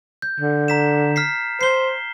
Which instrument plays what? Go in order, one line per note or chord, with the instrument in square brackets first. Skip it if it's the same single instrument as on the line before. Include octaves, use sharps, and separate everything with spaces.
[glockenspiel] G6
[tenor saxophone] D3
[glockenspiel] A#5 B6 E7
F6 B6 C7
[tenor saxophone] C5 [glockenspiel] C7 G7